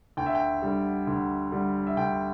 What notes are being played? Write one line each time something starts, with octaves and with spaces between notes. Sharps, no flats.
D2 G5
E5
G5
D3 G3
D2
D3 G3
E5
D2 G5